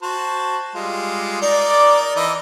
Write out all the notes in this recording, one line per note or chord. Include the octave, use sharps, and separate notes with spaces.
F#4 C5 A5
G3 G#3 F4
D#4 A#4 D5
E3 E4 D#5